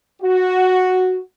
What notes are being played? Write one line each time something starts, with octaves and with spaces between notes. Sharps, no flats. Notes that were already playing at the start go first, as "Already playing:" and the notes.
F#4